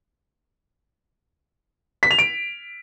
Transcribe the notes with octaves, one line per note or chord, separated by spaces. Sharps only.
B6
F7
D7